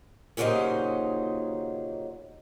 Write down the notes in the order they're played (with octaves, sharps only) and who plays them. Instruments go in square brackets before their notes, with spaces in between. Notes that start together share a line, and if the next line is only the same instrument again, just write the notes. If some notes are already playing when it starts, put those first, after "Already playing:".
[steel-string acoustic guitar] D#2 A#2 C#3 F#3 D#4 C5